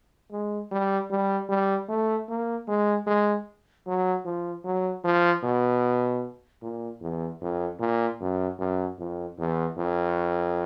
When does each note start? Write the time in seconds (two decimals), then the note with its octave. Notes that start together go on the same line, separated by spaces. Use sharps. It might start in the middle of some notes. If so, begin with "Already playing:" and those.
0.31 G#3
0.71 G3
1.11 G3
1.49 G3
1.89 A3
2.29 A#3
2.68 G#3
3.07 G#3
3.87 F#3
4.25 F3
4.65 F#3
5.04 F3
5.43 B2
6.62 A#2
7.01 E2
7.42 F2
7.80 A#2
8.20 F#2
8.59 F#2
8.99 F2
9.38 E2
9.77 F2